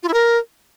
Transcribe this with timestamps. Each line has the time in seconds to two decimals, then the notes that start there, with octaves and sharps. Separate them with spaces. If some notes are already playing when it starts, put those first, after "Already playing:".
0.03 F4
0.08 E4
0.14 A#4